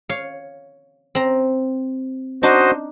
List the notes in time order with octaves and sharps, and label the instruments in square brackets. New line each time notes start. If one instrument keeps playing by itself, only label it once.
[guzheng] C#5 F5
C4 A#5
[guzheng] D4 D#4 [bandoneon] F#4 C5 D#5